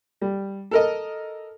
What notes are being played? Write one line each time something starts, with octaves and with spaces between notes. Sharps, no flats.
G3
A4 A#4 D#5